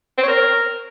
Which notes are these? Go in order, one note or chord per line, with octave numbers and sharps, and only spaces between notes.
C4
C#5
A#4